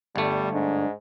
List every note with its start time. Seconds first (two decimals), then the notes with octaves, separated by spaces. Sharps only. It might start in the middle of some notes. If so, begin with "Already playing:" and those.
0.16 G1 G3 A3
0.53 G#2 D4